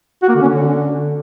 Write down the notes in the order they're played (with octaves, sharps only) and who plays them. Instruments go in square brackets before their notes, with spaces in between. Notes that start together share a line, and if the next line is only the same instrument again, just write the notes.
[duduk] F#4
A#3
D3
C#4
D3